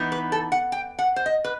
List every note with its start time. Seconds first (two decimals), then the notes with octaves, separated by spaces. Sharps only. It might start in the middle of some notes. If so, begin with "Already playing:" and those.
Already playing: E3 B3 D#4
0.12 B4
0.32 A4
0.52 F#5
0.72 G5
0.99 F#5
1.16 C5
1.26 D#5
1.44 B4